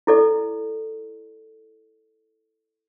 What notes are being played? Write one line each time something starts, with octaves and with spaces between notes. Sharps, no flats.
E4 A4 D5